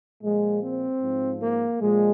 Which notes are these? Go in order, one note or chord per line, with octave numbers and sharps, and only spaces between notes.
A#2 F3 G#3
C4
G#2 F3
A#3
A#2 F3 G#3